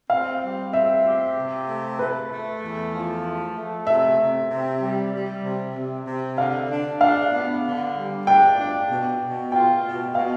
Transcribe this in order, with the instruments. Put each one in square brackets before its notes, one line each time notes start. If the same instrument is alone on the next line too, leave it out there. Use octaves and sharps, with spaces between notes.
[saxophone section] C4 [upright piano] F5
[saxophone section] G3
[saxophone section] C4 [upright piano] E5
[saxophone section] G4
C3
A3
[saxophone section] A3 [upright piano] B4
[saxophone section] A3
E2
F3
A3
A3
[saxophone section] C3 [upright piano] E5
[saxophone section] C3
C3
G3
G3
C3
C3
C3
[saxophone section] D3 [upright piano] F5
[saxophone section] D4
[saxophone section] D4 [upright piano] F5
[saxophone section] B3
D3
G3
[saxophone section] D4 [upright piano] G5
[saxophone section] D4
B2
B2
[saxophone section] F4 [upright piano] G5
[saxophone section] B2
[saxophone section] B2 [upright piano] F5